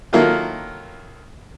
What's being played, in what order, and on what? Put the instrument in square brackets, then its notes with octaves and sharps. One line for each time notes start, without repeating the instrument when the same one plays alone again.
[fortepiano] D#3 F#3 A#3 E4 F4 A4